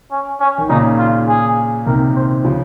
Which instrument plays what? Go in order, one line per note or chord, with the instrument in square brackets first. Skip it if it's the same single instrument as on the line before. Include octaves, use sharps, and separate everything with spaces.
[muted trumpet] C#4
C#4
[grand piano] D#3
[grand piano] A#2 C#3 [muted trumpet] D#4
[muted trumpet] F4
G#4
[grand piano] C3 D#3 [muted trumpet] A#4
[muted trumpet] C5
[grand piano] C#3 F3